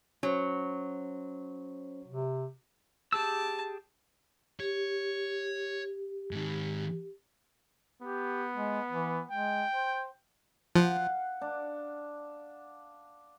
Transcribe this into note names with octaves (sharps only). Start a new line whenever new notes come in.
F#3 C#4 C5
C3
G4 G#4 A5 E6
G4 C#5
G#2 D#3
B3 G4
G#3
E3
G#3 G5
C5
F3 F5 F#5
D4